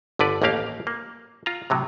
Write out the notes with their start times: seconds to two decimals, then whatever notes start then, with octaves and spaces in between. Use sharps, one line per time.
0.19 G1 D3 B4 D5
0.42 A1 D#2 A3 A#3 G4 F5
0.87 A#3
1.46 F4 A#5
1.70 A2 C3 F#3